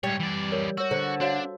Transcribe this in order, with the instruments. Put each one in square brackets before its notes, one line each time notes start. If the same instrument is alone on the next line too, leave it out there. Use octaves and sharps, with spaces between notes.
[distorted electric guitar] G#2 C#5 [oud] G3 [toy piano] G5
[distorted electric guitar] E3 D5
[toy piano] A#4 C#5
[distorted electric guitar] F#4 [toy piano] C#5 E6
[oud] D3 [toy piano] C5
[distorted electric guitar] D4 [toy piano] F#4 C#5 F5